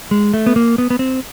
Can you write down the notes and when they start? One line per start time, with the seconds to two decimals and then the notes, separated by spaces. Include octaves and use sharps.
0.11 G#3
0.34 A3
0.46 B3
0.56 A#3
0.78 B3
0.90 B3
0.99 C4